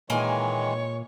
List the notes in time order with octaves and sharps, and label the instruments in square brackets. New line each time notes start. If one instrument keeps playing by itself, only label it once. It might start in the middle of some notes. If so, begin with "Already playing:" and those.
[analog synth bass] A#2 [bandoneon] D#3 E3 G#3 [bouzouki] A#3 G#5 [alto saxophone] C#5